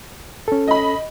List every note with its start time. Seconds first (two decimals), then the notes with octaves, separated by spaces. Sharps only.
0.48 C#4 A4
0.68 D#5 B5